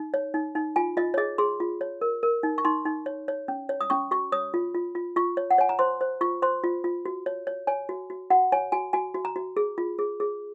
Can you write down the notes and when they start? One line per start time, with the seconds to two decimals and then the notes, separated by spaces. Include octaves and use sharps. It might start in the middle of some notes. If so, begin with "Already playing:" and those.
Already playing: D#4
0.14 C#5
0.34 D#4
0.55 D#4
0.76 F4 G#5
0.97 F4 D#5
1.14 C#5
1.18 G#4 D#5
1.38 G#4 C6
1.60 F4
1.81 C#5
2.01 A#4
2.23 A#4
2.43 D#4
2.58 C#6
2.65 D#4 C6
2.85 D#4
3.06 C#5
3.28 C#5
3.48 C#4
3.69 C#5
3.81 D#6
3.90 C#4 C#6
4.11 F#4 C#6
4.32 C#5 D#6
4.54 F4
4.75 F4
4.95 F4
5.16 F4 C#6
5.37 C#5
5.51 F#5
5.58 C#5 G#5
5.69 A#5
5.79 C5 C6
6.01 C5
6.21 F4 C#6
6.42 C5 C6
6.64 F4
6.84 F4
7.05 F#4
7.26 C#5
7.47 C#5
7.67 C#5 G#5
7.89 F#4
8.10 F#4
8.30 F#4 F#5
8.52 C#5 G#5
8.72 F#4 G#5
8.93 F#4 G#5
9.14 F#4
9.25 A#5
9.36 F#4
9.57 G#4
9.78 F4
9.99 G#4
10.20 G#4